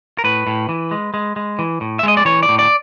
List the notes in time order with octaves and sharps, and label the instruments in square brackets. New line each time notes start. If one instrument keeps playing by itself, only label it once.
[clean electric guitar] A#4
A2 B4
A2
E3
G#3
G#3
G#3
E3
A2
E5
G#3 D#5
D5
E3 C#5
D5
A2
D5